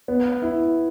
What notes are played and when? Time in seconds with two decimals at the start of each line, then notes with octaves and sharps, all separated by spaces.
0.08 B3
0.42 E4